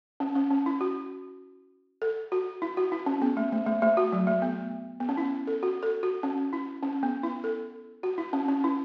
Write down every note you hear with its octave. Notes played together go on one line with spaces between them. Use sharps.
C#4
C#4
C#4
E4
F#4
A4
F#4
E4
F#4
E4
C#4
B3
A3
A3
A3
A3
F#4
F#3
A3
B3
B3
C#4
E4
A4
F#4
A4
F#4
C#4
E4
C#4
B3
E4
A4
F#4
E4
C#4
C#4
E4